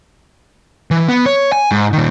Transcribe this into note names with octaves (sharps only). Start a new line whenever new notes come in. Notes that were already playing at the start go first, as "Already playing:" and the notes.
E3
B3
C#5
G#5
G#2
A#2 D#3